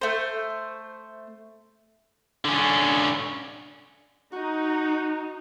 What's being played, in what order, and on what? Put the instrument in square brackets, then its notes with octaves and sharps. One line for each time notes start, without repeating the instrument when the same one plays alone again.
[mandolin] A3 C5
[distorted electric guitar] D3 C#4
[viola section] D#4 [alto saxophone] F#4